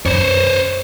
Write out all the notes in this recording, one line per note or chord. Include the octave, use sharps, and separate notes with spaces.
F#2 C5 C#5